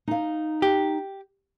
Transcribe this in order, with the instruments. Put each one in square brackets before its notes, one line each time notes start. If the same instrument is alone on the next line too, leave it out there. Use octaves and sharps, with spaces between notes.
[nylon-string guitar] D#4 F5
[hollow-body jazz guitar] G4